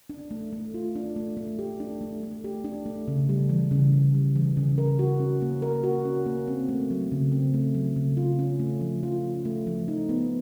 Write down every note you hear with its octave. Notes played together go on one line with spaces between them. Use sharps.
D4
A3
A3
F4
D4
A3
A3
G4
D4
A3
A3
G4
D4
A3
C#3
G3
E3
C#3
C#3
G3
E3
C#3
A#4
F#4
C#4
A#3
A#4
F#4
C#4
A#3
C4
A3
F#3
C#3
C4
A3
F#3
C#3
F4
C#4
A3
F3
F4
C#4
A3
F3
D#4
B3